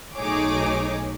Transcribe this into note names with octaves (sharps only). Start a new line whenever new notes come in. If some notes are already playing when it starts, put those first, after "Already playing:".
B1 A3 D#4 G#4 C#5 D6